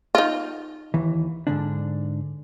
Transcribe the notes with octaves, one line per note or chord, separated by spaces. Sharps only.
D#4 F4
D#2 E3
G#2 D3 D4